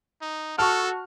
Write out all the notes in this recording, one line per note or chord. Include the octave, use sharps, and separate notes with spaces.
D#4
F#4 A4 A5 C#6 F6